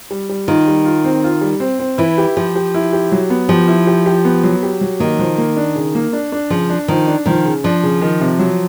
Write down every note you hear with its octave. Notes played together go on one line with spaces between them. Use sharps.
G3
G3
D#3 F4
G3
F4
C4
F4
G3
C4
C4
E3 E4
G4
F3 G4
G4
E4
G4
F#3
B3
F3 G4
E4
G4
G4
B3
F#3
G4
F#3
D#3 A#3
F3
A#3
D4
C#3
A#3
D4
D4
C#3 F3
D4
D#3 F3
D4
D#3 F3
C#3
F3 D4
C#3
D#3
C3
F#3